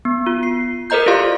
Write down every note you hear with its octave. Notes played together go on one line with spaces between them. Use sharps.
B3
F4
C7
A4 A#4 C5 D#5 A#5 G6
E4 F4 G4 D5 F5 C6